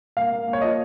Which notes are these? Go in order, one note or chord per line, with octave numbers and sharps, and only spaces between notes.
A#3 F5
A#3
A#3
C#5
F3 D#5